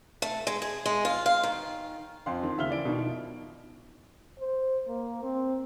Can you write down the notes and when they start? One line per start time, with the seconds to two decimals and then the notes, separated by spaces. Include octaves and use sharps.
0.22 A3
0.47 G#3
0.62 G#4
0.86 G#3
1.05 F4
1.26 F5
1.43 D#3
2.26 F2 F5 C6
2.43 D#3
2.57 D#2 C#3 E5 F5 F6 G7
2.69 E3 D5 D7
2.85 B2 D#3 D#4
3.00 F3
4.40 C5
4.88 A#3
5.23 C4